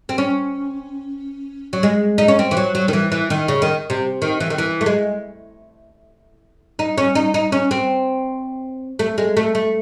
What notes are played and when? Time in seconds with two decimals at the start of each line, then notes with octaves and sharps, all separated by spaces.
0.09 C4
0.18 C#4
1.73 F#3
1.83 G#3
2.18 D#4
2.28 C#4
2.39 C4
2.51 E3
2.57 F#3
2.75 F#3
2.88 D#3
2.93 E3
3.12 E3
3.30 D#3
3.48 C#3
3.62 D#3
3.90 C3
4.22 D#3
4.40 E3
4.50 D#3
4.58 E3
4.81 A3
4.86 G#3
6.79 D#4
6.98 C#4
7.15 D#4
7.34 D#4
7.52 C#4
7.71 C4
8.99 A3
9.18 G#3
9.37 A3
9.55 A3